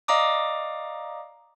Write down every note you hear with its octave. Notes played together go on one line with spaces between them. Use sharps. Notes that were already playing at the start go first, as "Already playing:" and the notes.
D5 D#5 F5 A#5 D6 D#6